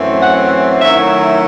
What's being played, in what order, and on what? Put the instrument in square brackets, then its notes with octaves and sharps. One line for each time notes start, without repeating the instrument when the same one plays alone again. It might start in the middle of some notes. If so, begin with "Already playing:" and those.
Already playing: [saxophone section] F#2 E3 A3 C4
F#5
D#3 F#3 A3 C#4 E4 E5